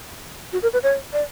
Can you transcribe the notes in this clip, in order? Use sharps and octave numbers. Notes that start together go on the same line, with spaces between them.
F#4
A#4
B4
C#5
D5